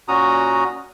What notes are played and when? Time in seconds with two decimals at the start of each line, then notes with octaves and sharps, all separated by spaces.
0.08 A#2 C#4 F#4 A#5 D#6